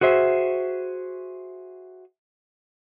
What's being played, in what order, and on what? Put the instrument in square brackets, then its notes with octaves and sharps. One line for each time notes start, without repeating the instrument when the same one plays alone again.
[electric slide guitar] F#4 G#4 C5 E5